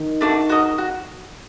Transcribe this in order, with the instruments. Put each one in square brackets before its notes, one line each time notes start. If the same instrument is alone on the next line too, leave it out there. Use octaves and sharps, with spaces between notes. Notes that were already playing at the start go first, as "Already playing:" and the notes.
Already playing: [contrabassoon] D#3
[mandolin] A3 D4 F#4
F#4 A#4 D#5
F#4